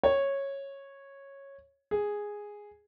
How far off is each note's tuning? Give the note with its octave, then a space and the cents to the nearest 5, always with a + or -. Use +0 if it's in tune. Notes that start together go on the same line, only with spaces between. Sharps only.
C#5 -10
G#4 -5